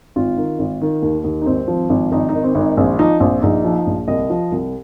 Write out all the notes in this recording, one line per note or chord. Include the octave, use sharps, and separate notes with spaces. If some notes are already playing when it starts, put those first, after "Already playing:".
G#1 F4
D#3
G#1
D#3
D#2
D#2
D#4
G#1 C4
F3
G#1
G#1 D#4
D#4
D#3
C4
G#1
D#4
A#1 C4
F3 D#4
A#1 C4
A#1 D#4
F3
A#1
C2 D#5
F3
C2